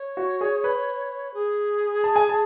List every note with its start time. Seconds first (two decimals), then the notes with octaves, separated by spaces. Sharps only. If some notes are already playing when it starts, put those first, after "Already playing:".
Already playing: C#5
0.17 F#4
0.41 G#4
0.64 B4
1.34 G#4
2.04 A5
2.16 G#5
2.29 A5